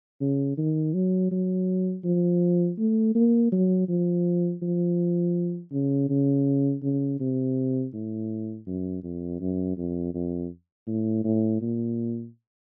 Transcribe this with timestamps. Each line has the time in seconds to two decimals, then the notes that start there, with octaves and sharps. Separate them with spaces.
0.21 C#3
0.57 D#3
0.94 F#3
1.31 F#3
2.04 F3
2.78 A3
3.15 A#3
3.52 F#3
3.88 F3
4.62 F3
5.72 C#3
6.09 C#3
6.83 C#3
7.20 C3
7.93 A2
8.67 F#2
9.03 F2
9.40 F#2
9.77 F2
10.14 F2
10.87 A2
11.24 A2
11.61 A#2